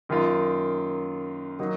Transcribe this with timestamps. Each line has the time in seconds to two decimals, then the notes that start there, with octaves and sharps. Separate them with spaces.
0.09 F#2 D#3 A#3 F4
1.59 D#3 F#3 A#3 D#4